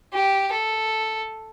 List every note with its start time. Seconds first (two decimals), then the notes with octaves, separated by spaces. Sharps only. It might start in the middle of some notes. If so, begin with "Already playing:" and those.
0.13 G4
0.52 A4